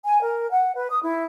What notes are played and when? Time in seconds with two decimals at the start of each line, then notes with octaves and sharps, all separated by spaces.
0.05 G#5
0.23 A#4
0.51 F#5
0.75 B4
0.90 D#6
1.03 E4